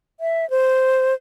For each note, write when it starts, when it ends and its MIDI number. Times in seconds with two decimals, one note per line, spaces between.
0.20 0.48 76
0.50 1.14 72